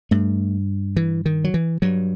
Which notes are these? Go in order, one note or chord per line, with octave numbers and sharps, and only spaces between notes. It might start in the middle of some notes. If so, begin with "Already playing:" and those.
G2 A3
E3
D#3
F#3
E3
G2 F#3